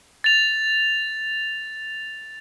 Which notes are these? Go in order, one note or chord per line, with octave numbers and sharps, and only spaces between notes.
A6 F7